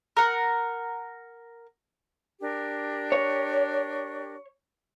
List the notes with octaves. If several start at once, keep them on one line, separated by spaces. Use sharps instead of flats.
A#4 F#5
D4 G4 A#4
C#5